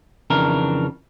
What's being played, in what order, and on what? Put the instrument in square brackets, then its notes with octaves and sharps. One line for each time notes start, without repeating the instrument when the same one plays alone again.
[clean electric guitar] F2 C#3 E3 D4 A#4